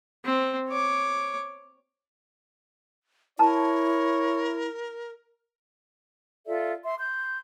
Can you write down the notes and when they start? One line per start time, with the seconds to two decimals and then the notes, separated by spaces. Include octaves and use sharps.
0.25 C4
0.69 C#5 D6
3.39 E4 A#4 C#5 A5 A#5
6.47 F4 A4 D5 E5
6.84 E5 C6
6.98 C6 G6